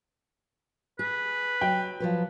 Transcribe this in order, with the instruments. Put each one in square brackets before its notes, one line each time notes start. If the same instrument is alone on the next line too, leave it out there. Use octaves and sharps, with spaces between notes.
[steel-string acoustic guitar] G#4 [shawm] B4
[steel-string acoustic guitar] F#3 [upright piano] G5
[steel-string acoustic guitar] F3 F#3 B4